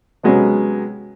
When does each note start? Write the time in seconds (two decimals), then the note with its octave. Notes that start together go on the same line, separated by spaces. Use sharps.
0.23 C3 F#3 G#3 B3 C#4